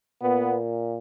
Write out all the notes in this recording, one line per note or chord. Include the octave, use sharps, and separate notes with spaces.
A#2 B3